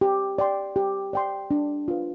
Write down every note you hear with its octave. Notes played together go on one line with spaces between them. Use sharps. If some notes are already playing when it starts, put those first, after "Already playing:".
G4
D5 G5 C6
G4
D5 G5 C6
D4
F4 B4